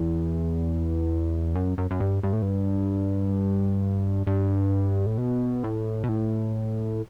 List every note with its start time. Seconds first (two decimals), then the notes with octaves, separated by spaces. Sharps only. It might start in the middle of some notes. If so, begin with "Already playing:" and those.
Already playing: E2
1.55 F#2
1.78 F#2
1.91 F#2
2.00 G2
2.23 G2
2.33 A2
2.42 G2
4.27 G2
5.06 A2
5.18 B2
5.64 A2
6.03 B2
6.09 A2